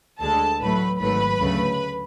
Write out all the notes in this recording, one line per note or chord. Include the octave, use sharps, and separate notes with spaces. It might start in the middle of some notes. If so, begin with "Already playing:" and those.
D2 D3 G#3 A4 A5
A1 A2 F#3 A3 B4 B5
G#1 G#2 F#3 A3 B4 B5
D2 C#3 F#3 A3